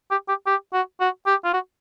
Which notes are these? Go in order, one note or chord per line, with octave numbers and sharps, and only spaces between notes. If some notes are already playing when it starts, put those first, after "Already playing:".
G4
G4
G4
F#4
F#4
G4
F4
F#4